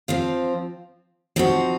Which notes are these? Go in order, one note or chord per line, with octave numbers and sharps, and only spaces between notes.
F3 C4 F4
F3 C4 D#4 F#4